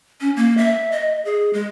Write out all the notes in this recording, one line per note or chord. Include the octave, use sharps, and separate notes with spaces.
C#4
A#3
E5
D#5
G#4
G#3